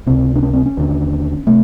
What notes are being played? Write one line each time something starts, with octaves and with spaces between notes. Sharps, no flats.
C#2 C3 C4
D4
C#4
C4
C#4
D#2 D3
C3 A3